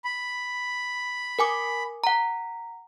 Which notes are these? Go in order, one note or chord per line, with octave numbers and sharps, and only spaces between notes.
B5
A#4 G#5 D6
F#5 A#5